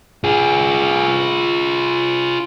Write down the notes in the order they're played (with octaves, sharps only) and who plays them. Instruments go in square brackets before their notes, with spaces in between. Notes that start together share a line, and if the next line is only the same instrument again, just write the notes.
[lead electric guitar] F4 G#4